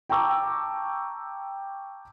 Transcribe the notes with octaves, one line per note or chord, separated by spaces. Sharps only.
G5 A5 A#5 C#6 D6 E6